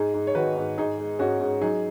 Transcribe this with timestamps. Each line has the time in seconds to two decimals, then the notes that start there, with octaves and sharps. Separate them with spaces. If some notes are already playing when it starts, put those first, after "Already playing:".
Already playing: G#2 D#4 G#4
0.14 G#2
0.27 C#5
0.35 D#3 F#4 B4
0.57 G#2
0.78 G#2 D#4 G#4
0.98 G#3
1.19 G#2 C#4 F#4
1.40 G#2
1.61 F#3 D#4 G#4